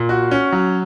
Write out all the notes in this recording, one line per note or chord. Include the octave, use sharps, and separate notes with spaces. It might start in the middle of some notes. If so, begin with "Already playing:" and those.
Already playing: A#2
F#4
C#4
F#3